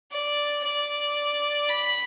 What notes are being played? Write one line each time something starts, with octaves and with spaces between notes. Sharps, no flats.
D5
D5
B5